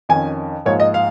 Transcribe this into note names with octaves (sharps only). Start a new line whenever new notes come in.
F2 D#3 C#4 G#5
G#2 F3 A#3 C#5
D#5
F5